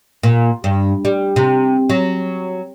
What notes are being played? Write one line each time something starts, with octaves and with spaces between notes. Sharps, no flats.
A#2
G2
G3
C3
F#3